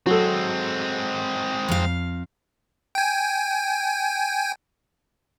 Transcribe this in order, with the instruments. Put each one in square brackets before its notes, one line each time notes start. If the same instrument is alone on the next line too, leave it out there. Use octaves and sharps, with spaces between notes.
[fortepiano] F#3 A4 [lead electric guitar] G#3 C4
[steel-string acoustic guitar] F2 F5
[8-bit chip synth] G5 G#5